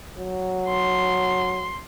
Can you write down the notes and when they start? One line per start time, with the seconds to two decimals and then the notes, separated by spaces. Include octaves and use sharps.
0.18 F#3
0.69 C6